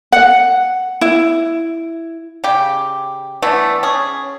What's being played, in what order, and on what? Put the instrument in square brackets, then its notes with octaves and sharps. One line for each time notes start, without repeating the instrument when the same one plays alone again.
[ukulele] F#5
E4
[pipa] C#3 G4
E3 A3 B3 D4
C#4 G#4